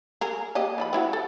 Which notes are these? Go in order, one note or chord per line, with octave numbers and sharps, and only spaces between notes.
G#4 A#4
A#3 G4 D#5
D#3 F3 B5
C4 E4 F#4
A4